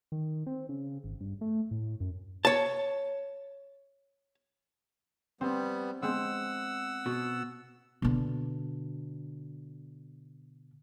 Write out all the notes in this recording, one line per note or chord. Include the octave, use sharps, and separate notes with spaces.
D#3
C4
C#3
G#1
G2
A3
A2
F#2
C#5 A5
G3 B3 C4
G#3 B3 C4 F#5 E6
B2 F#4
B2 D3